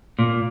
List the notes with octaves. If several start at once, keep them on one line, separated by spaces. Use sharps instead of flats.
A#2